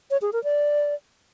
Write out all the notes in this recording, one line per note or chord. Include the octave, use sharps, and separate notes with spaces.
C#5
G#4
A#4
D5